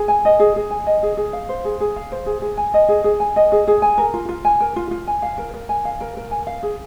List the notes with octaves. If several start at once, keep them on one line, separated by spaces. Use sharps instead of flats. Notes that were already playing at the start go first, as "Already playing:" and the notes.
Already playing: G#4
G#5
D#5
G#4
G#4
G#5
D#5
G#4
G#4
F5
C5
G#4
G#4
F5
C5
G#4
G#4
G#5
D#5
G#4
G#4
G#5
D#5
G#4
G#4
G#5
A#4
F4
F4
G#5
A#4
F4
F4
G#5
F5
A#4
A#4
G#5
F5
A#4
A#4
G#5
F5
G#4